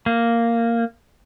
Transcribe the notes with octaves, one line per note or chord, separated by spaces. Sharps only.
A#3